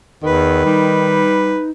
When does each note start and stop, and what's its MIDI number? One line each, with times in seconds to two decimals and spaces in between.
0.23 0.65 40
0.23 1.26 51
0.23 1.69 71
0.65 1.56 55
0.65 1.71 63